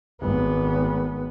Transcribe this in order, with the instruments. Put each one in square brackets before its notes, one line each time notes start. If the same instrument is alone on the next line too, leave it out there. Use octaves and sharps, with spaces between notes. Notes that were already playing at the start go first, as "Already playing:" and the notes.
[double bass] G#1 B3